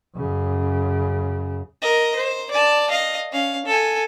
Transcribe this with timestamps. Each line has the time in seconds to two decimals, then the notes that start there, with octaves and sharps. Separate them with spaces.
0.15 F#2 C#3
1.82 A#4 D#5
2.16 C5
2.51 D5 A5
2.90 D#5 F5
3.32 C#4 F5
3.66 A4 G#5